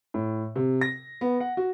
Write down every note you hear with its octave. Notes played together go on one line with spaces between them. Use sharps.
A2
C3
A#6
B3
F#5
F#4